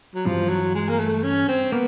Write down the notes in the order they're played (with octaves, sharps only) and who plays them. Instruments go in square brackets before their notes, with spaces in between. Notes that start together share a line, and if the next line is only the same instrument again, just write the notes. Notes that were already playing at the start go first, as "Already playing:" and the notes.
[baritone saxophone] F#3
[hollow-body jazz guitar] G2 E3 G3 C4 [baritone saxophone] F3
[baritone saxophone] F#3
G#3
A#3
A3
C#4
C4
[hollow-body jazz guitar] A#3 [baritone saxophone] B3